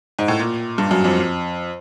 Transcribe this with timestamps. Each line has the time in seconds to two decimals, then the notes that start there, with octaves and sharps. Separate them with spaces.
0.19 G#2
0.28 A2
0.39 A#2
0.78 G2
0.91 F#2
1.04 F2